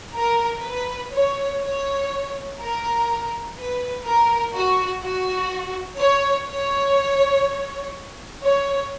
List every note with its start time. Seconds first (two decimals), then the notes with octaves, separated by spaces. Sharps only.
0.16 A#4
0.65 B4
1.13 C#5
1.63 C#5
2.60 A#4
3.57 B4
4.05 A#4
4.54 F#4
5.03 F#4
5.99 C#5
6.49 C#5
8.43 C#5